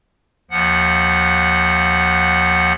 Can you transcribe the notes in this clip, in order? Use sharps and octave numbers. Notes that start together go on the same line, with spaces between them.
D#2 F3 F#5